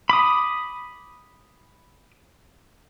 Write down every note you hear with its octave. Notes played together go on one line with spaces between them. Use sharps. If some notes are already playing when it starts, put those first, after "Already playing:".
B5 D6 D#6